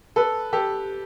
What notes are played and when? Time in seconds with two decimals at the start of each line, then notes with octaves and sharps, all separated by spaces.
0.16 A4 B4
0.53 G4 A4